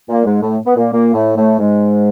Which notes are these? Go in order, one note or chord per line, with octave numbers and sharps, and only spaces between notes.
A#2 A#3
G#2 G#3
A2 A3
B3
A#2 A#3
A#2 A#3
A2 A3
A2 A3
G#2 G#3